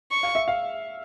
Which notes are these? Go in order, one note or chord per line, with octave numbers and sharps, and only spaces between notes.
C#6
F5
E5
F5